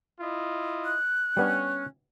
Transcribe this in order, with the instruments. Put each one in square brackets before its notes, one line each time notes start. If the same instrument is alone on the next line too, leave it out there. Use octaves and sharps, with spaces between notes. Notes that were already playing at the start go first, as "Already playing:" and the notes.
[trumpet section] E4 F4 D#5
[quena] F#6
[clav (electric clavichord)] G3 B3 D4 [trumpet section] C#4